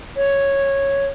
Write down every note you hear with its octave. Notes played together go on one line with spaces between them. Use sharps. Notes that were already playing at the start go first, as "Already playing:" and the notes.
C#5